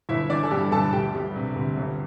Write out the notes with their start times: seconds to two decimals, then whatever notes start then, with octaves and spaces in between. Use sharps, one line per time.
0.09 G1 E4 E5
0.29 E3 D4 D5
0.43 A4
0.51 G2 G3 G4
0.72 G1 A4 A5
0.92 D2 G4 G5
1.15 G3
1.35 C3
1.56 D2
1.77 G1